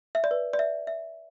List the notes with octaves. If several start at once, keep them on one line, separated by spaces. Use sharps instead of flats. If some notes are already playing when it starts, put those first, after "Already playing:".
E5
D5
B4
D5
E5
E5